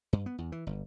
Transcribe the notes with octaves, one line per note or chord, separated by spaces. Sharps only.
G2
B3
E2
E3
G1